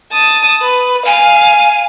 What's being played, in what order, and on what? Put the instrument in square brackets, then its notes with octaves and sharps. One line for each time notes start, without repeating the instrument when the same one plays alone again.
[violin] A5 D#6
B4
[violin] F5 [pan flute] G#5